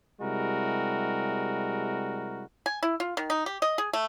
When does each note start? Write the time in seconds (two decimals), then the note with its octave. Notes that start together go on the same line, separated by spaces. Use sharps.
0.21 C3 G3 G#3 E4 F#4 A#4
2.66 G#5
2.83 E4
3.00 F4
3.17 D#3
3.30 D#4
3.46 G4
3.62 D#5
3.78 G#4
3.93 A3